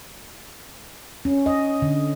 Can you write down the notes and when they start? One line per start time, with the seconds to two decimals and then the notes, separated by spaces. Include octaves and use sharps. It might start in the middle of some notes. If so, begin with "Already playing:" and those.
1.25 C#4
1.46 D#5
1.82 D3